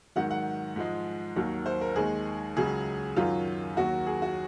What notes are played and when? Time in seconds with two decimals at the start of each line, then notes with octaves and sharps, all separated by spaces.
0.16 G#2 D#3 F#3 F#5
0.31 F#5
0.76 G#2 F3 G#3
1.36 D#2 D#3 F#3
1.66 C5
1.81 A#4
1.96 D#2 D#3 G#3 G#4
2.56 C#2 C#3 F#3 G#4
3.16 F#2 D#3 F#3 F4
3.76 D#2 D#3 F#3 F#4
4.07 G#4
4.22 F#4